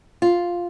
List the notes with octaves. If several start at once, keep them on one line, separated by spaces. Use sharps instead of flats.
F4